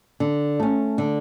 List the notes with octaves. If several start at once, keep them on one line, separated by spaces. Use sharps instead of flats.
D3
A3 C#4
D3